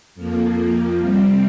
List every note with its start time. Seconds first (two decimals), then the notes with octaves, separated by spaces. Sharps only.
0.15 F2 F3 A#3
0.99 C3 G3 C4